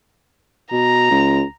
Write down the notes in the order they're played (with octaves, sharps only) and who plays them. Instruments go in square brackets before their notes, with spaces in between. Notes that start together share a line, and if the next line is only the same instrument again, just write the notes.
[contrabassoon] B2 [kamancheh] A#5
[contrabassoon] C#2